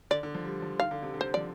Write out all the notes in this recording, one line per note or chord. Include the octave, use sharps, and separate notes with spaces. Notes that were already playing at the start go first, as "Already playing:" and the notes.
D3 D5
D3
F3
G3
F3
D#3 F5
D3
C3
D3
C5
F3 D5